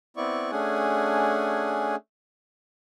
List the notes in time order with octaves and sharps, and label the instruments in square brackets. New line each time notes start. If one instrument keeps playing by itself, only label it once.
[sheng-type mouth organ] B3 C4 E4 D5 C#6
A3 C#4 D4 G#4 F#5 G#5